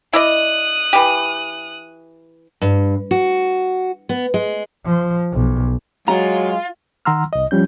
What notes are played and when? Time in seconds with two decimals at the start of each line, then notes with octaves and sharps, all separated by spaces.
0.13 E4 D5 D#5 D#6 F#6
0.93 E3 G4
2.62 G2
3.11 F#4
4.09 B3
4.34 G#3
4.86 F3
5.33 B1
6.08 F#3 G#3 F4 A#5
7.05 D#3 F#5 A#5 C6 E6 F6
7.33 C2 D#5
7.51 F3 G3 C#4 G6